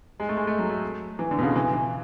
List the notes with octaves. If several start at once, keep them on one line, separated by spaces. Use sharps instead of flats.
G#3
A3
G#3
A3
F#3
A3
E3
D3
B2
C#3
E3
E3